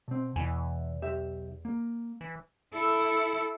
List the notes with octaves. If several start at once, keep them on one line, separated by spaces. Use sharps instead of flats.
B2 C4
E2 B2 E3 G#5
B1 G4 E5
A#3
E3
E4 A4